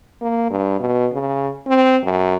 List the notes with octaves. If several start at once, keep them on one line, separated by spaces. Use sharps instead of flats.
A#3
G2
B2
C#3
C4
F#2